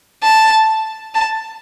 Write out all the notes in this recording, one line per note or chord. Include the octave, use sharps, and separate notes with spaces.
A5
A5